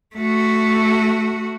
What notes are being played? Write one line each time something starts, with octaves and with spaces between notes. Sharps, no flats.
A3 F#4